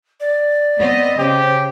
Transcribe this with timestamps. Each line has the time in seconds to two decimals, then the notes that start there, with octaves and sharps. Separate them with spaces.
0.20 D5
0.78 B3 C4 D#5
1.19 C#3 G4 C5